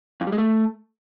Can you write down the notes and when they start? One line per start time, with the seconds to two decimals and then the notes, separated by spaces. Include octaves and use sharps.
0.21 F2
0.27 G3
0.32 G#3
0.38 A3